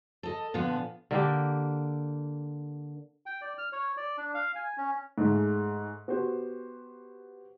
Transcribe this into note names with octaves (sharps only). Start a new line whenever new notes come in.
A4 D#5
A#2 D3 F3 B3
D3 A#3 G4
G5
D5
F6
C#5
D5
D4
F5
G#5
C#4
G#2 G#3 A3
B3 F#4 G4 C5